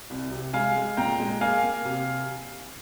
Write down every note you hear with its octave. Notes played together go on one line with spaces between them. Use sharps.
C2
C3
G#3 F5 G#5
G#3
A#2 G5 A#5
G#3
A#3 F5 G#5
A#3
C3